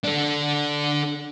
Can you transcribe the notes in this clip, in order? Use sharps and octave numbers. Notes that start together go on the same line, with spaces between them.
D4 A4